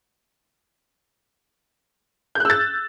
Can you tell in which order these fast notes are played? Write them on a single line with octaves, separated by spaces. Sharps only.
G6 F#6 E6 A6